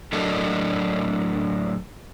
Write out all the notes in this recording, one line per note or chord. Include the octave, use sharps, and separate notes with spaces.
A2 F#3 D4 A4 A#4 D#5